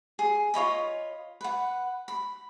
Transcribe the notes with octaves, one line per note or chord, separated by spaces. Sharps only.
G#4
F4 C#5 D#5 B5
B4 F#5
B5